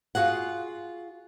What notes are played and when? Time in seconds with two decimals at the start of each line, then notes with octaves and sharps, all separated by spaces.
0.15 F4 F#4 G#4 F#5